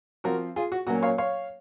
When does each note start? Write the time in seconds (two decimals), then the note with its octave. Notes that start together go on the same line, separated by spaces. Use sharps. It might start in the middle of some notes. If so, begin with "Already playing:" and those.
0.24 F3 C4 F#4 A#4
0.56 F4 G#4
0.72 F#4
0.87 A#2 F#3 A#3 C#4 F#4
1.03 C#5 F5
1.18 C#5 F5